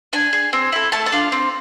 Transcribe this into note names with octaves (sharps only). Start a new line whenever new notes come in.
D4 G#5
G#4
C4
E4 A4
A3 A5
A5
D4 F4
C4